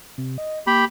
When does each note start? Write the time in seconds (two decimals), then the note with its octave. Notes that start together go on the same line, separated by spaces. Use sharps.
0.18 C3
0.38 D#5
0.67 A#3 G4 B5